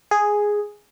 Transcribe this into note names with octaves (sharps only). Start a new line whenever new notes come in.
G#4